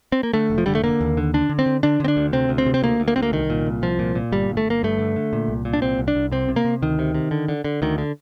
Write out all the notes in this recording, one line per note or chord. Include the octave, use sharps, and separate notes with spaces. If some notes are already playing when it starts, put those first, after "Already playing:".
C4
A#3
D3 A3
F1
F3
D3 G3
A3
D3 A#3
D#2
D3
D3 D4
D3
C4
D3
D3 D4
D3 C4
D4
D2
C3 C4
D2
C4
C3
C4
D2 A#3
D2
A#3
D2 C4
A#3
C2 D#3
A#2
C2
C2 F3
A#2
A#2
G1 G3
G1
A3
G1
A#3
G2 A3
D3
D3
A#2
C2
A#2
D4
C2 C4
C2
D4
C2
C3 C4
C3
A#3
C3
D2 D#3
C3
C3
D3
D3
D3
D2 D#3
D3